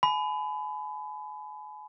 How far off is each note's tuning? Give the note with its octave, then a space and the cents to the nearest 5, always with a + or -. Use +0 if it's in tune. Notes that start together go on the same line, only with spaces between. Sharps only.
G#5 +35 B5 +25